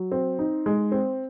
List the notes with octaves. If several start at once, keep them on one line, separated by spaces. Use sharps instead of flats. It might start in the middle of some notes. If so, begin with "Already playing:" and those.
Already playing: F#3
C4
D#4
G#3
C4